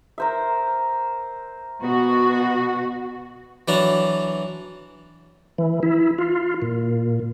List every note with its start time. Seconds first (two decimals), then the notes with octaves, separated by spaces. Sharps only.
0.18 A#4 C5 E5
1.83 B2 B3 F#4
3.68 E3 F#3 D4 A5 A#5
5.58 E3
5.83 E4
6.18 F4
6.62 A#2